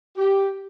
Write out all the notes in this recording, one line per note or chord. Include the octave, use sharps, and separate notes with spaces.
G4